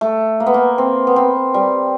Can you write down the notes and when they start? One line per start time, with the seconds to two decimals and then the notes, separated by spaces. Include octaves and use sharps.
0.01 A3
0.40 A#3
0.46 B3
0.54 A#3
0.78 C4
1.07 B3
1.16 C4
1.54 G3